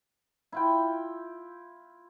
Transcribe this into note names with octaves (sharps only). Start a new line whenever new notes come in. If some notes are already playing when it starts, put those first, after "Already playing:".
E4 F4 G5